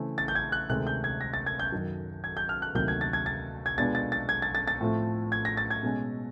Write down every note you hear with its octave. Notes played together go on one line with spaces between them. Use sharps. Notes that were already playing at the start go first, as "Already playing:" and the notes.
Already playing: C#3 E3 A3 C4 E4
A6
G6
G#6
F#6
D2 C3 D#3 G#3 F#6
G6
G#6
A#6
A6
G#6
G6
F#2 D#3 F#3
G#6
G6
F6
F#6
D2 C3 D#3 F#3 A#3 G6
G#6
A6
G#6
A6
G#6
B2 G#3 B3 D4 F4 A6
A6
A6
G#6
A6
A6
A6
A2 F3 A3 C4
G#6
A#6
A6
G#6
B2 G#3 C#4